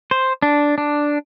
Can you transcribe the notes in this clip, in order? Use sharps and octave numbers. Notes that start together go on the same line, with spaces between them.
C5
D4
D4